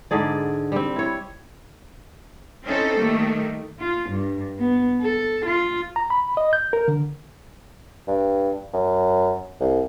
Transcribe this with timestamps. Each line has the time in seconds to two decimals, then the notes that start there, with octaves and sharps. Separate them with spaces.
0.11 G#2 D3 G#4 D5
0.72 G3 C4
0.96 E4 C#5
2.64 C4 C#4 D#4 E4 A4 C5
2.98 D#3 G3 A3 A#3
3.80 F4
4.09 G2
4.59 B3
5.02 A4
5.45 F4
5.96 A#5
6.10 B5
6.37 D#5
6.53 G6
6.73 A#4
6.88 D3
8.08 G2
8.74 F#2
9.60 C2